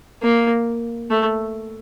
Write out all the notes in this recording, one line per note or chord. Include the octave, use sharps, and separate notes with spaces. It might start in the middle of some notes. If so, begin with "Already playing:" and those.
A#3
A3